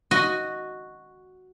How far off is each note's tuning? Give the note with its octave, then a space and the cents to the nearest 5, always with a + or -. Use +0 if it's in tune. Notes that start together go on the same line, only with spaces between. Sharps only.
F#4 +0 D#5 +0